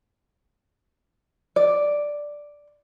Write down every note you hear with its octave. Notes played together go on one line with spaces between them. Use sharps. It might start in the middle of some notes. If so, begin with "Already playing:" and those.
D5